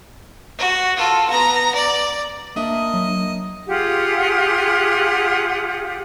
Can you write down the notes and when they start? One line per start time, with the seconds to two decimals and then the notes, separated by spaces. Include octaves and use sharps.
0.58 F#4
0.97 F4 A4
1.30 B3 A#5
1.75 D5
2.56 A#3 D4 D#5 E5
2.94 F#3
3.68 F4 G4 G#4 F#5